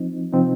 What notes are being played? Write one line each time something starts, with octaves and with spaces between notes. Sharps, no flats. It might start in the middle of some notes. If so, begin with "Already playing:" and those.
Already playing: F3 C4 D#4
C3 F3 C4 D#4